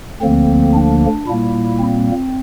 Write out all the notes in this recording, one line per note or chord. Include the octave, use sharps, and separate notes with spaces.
D2 D3 F3 A#3 C4
D4
A#2 G3 A#3 E4
C4